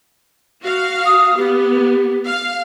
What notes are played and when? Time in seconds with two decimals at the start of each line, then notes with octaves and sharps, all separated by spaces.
0.62 F#4 F5
1.05 D#6
1.37 B3 G4
2.26 F5